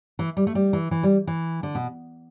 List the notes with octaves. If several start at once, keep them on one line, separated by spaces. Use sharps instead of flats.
E3
G3
A3
G3
E3
E3
G3
E3
D3
B2